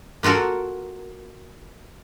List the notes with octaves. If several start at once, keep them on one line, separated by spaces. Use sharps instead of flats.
A#3 F4 F#4 A4 A#4